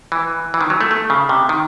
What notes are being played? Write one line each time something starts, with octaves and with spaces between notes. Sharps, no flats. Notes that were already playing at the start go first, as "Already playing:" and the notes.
E3
E3
D#3
F#3
A3
A3
C#3
C3
D#3